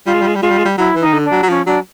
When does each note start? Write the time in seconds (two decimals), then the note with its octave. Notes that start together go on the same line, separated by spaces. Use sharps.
0.06 G3 F4
0.14 G#3
0.21 G3
0.27 G#3
0.35 G3
0.41 G#3 F4
0.50 G3
0.58 G#3
0.65 G3
0.78 F#3 E4
0.95 E3
1.01 D#3 D#4
1.13 D3
1.25 D4
1.31 F#3
1.43 F#3
1.49 F3 C#4
1.66 F#3 D4